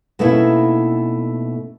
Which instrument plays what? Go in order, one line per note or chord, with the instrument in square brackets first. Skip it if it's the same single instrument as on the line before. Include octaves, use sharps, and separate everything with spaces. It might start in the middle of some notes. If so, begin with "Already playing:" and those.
[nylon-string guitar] B2 A3 A#3 C#4 D#4 E4